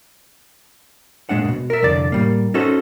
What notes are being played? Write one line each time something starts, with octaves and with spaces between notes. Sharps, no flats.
A#2 C#3 G#3 D4 F#5
G#2 B2
A#4 E5
C2 F2 D3 D5
A2 G3 A#3
C#4 D#4 F#4 A4 C5